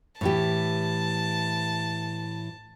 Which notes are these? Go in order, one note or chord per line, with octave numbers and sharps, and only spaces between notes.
A2 E3 G4 A5